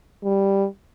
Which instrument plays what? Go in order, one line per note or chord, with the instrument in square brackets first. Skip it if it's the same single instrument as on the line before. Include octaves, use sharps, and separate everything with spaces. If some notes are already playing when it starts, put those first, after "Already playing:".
[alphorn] G3